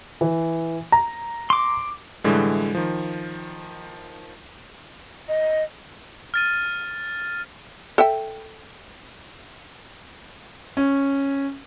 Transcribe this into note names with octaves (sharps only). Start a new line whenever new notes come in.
E3
A#5
C6 D6
A2 D3 E3 G3 G#3
D#3 F3
D#5
F6 A6 D#7
A4 E5 G5
C#4